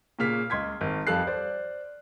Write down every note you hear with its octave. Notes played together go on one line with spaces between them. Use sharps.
A#2 C#3 A#3 F6 B6
C#2 C6 G#6 B6
G#1
F2 G3 A4 F5 F#6 C7
C5 D5